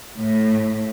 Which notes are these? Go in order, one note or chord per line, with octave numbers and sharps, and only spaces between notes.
A2